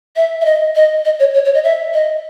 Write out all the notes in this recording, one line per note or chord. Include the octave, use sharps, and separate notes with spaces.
E5
E5
D#5
D#5
D#5
C#5
C#5
C#5
D#5
E5
D#5